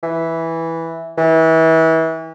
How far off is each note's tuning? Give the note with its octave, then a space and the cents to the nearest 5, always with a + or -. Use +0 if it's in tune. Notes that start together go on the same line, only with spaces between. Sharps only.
E3 -5
E3 -30